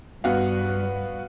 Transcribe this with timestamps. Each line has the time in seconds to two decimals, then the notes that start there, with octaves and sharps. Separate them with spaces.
0.24 G2 B3 F#4 F5